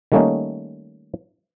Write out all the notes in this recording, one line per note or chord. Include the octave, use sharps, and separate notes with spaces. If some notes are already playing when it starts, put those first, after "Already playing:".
D#3 G3 A3 A#3 C#4 D#4